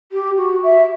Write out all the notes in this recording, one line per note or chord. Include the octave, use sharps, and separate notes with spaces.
G4
F#4
E5